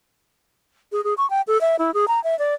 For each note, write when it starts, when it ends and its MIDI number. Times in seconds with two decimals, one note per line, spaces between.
0.92 1.03 68
1.04 1.14 68
1.18 1.29 85
1.30 1.41 79
1.47 1.60 69
1.61 1.76 76
1.79 1.93 64
1.94 2.08 68
2.08 2.22 82
2.24 2.37 76
2.39 2.54 74